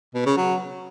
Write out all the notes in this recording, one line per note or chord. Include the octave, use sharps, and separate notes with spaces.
B2
C#3
F#3